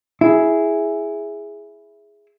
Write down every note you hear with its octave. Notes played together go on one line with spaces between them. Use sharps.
E4 G#4